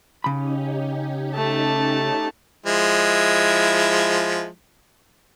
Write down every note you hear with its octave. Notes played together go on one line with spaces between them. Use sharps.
C#3 C#4 D#4 G4 B5
A3 A5
F3 G#3 E4